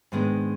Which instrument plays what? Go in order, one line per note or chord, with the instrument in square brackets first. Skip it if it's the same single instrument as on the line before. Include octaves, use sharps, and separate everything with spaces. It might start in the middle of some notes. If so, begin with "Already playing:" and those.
[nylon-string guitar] G#2 D#3 G#3 B3 D4